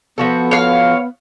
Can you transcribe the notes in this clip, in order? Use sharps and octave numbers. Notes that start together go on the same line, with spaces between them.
F3 B3 F#4 A4
C#5 F5